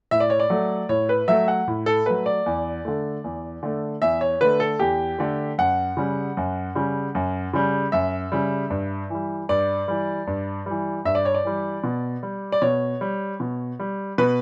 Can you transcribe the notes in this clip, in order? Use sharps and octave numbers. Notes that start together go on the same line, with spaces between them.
A2 E5
D5
C#5
D5
F#3 A3
A2 C#5
B4
F#3 A3 E5
F#5
A2
A4
F#3 A3 B4
D5
E2
D3 A3
E2
D3 A3
E2 E5
C#5
D3 A3 B4
A4
E2 G4
D3 A3
F#2 F#5
C#3 G3
F#2
C#3 G3
F#2
C#3 G3
F#2 E5
C#3 G3
G2
E3 G3
G2 D5
E3 G3
G2
E3 G3
G2 E5
D5
C#5
D5
E3 G3
B2
G3
D5
B2 C#5
G3
B2
G3
B2 B4